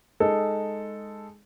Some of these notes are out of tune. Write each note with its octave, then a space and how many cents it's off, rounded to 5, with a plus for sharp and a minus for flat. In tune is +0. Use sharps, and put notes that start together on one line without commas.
G#3 +0 D#4 +0 A4 +0